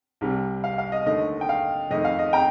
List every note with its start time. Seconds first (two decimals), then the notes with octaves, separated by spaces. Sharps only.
0.21 C2 C3 G3
0.64 F5
0.78 F5
0.92 D#5
1.06 D#2 D3 A3 D#5
1.41 G5
1.49 F5
1.91 F2 D#3 A3 D#5
2.05 F5
2.19 D#5
2.33 G5 A#5